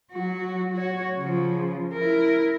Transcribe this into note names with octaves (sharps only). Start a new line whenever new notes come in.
F#3 F#4
F#4 C#5
C#3 F3
E4 A#4